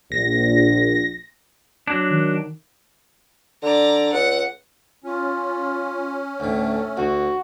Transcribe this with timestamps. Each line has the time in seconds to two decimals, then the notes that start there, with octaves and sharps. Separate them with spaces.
0.12 A#1 A#6
1.87 F#3 D4
2.10 D#3
3.63 D3 D5 A#5
4.13 C#2 F#5
5.04 C#4 F4
6.40 D2 A2 A3
6.97 D2 F#4